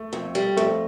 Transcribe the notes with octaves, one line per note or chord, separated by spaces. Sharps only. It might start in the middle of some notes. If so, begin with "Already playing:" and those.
Already playing: A3
F2
G3
F2 A3